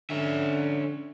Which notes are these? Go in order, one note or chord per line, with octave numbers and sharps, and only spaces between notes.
D3 C#4 E5